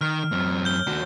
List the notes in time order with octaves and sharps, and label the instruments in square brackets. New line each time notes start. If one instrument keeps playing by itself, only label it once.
[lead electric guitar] D#3 [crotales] F6
[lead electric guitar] F#2 C4
[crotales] G6 G7
[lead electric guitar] D#2 F#4